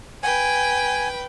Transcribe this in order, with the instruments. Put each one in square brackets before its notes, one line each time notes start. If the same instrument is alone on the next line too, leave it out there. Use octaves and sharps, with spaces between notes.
[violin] B4 G5 [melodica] G#5